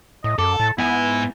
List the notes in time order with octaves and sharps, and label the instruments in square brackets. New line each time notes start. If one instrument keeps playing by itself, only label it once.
[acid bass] A2 [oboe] D#5
[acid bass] F#2 [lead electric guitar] A4 [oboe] D6
[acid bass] A2 [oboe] A5
[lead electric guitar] G#2 G#5 [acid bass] B3 [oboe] E4